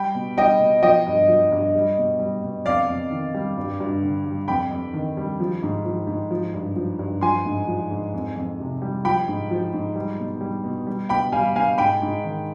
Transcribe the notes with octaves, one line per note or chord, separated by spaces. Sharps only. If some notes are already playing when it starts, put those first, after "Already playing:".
Already playing: G3 G5 B5
B2
G3 D#5 G5
B2
F3 D#5 G5
G2
F3
G2
G3
B2
G3
B2
F2 D5 F5
F2
D#3
G3
G2
G2
D3
G3
F2 G5 B5
F2
D#3
G3
F3
G#2
F3
G#2
F3
G2
F3
G2
F3 G#5 C6
G#2
F3
G#2
F2
F2
C3
G3
F3 G5 B5
G#2
F3
G#2
G3
B2
G3
B2
G3
B2 G5 B5
G3 F5 G#5
B2 F5 G#5
G#2 G5 B5
G#2
D#3